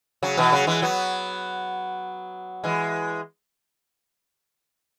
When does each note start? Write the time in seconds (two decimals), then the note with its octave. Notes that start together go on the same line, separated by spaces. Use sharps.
0.23 C#3 F#3
0.37 B2 E3
0.52 C#3 F#3
0.67 E3 G#3
0.82 F#3 B3
2.64 E3 G#3